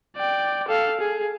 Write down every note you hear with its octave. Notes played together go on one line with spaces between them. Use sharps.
D5 G5
A4 F5
G#4